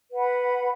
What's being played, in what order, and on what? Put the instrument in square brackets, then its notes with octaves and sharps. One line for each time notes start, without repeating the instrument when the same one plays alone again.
[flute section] B4 F#5 B5